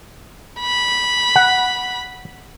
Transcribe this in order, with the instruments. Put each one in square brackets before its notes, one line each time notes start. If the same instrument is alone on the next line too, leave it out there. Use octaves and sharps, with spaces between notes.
[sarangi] B5
[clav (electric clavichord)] F#5